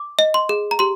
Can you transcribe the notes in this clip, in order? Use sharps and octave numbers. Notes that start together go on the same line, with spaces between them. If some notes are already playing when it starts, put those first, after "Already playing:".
Already playing: D6
D#5
C6
G#4
A#5
G4 C6